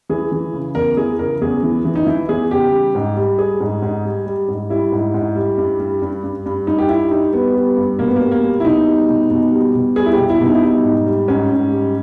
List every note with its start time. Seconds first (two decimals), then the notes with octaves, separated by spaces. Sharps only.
0.09 E3 G#4
0.32 E3
0.53 C#3
0.75 E2 A#4
0.97 E3 G#4
1.19 C#3 A#4
1.41 E2 G#4
1.63 E3
1.85 E3
1.95 D#4
2.06 E3 E4
2.29 E2 G#4
2.51 C#3 G4
2.72 G3
2.95 G#2
3.16 G3
3.38 G3 G#4
3.60 G#2
3.82 G#2
4.05 G3
4.26 G3
4.48 G#2
4.70 G3 E4
4.92 G#2
5.14 G#2
5.35 G3
5.58 G2
5.80 G3
6.02 G2
6.23 G2
6.46 G2
6.67 G2 D#4
6.78 G4
6.89 G3 E4
7.11 G3 D#4
7.33 G3 B3
7.55 G3
7.77 G2
7.99 B2 A#3
8.07 B3
8.16 G3 A#3
8.31 A#3
8.43 G3
8.60 E4
8.65 B2 D#4
8.87 G3
9.09 B2
9.31 B2
9.52 G3
9.75 B2
9.96 G3 G#4
10.06 E4
10.13 G4
10.18 B2
10.29 E4
10.40 B2
10.46 D#4
10.54 E4
10.62 G3 D#4
10.83 G#2
11.06 G3
11.28 G#2 C#4
11.50 G#2
11.72 G3